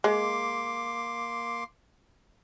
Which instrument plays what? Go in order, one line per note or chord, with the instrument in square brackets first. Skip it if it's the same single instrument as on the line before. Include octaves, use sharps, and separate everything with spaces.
[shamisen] G#3 [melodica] A#3 C6 D6